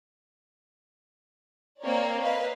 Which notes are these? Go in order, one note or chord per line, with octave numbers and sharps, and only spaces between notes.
A#3 C4 A#4 C#5 D5
B4 D#5 F5